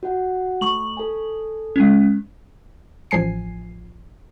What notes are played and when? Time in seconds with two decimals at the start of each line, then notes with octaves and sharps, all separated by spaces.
0.03 F#4 F#5
0.61 A3 C#6 F#7
0.97 A4 G#5
1.76 G#3 C#4
3.11 A1 F3 G#5 C7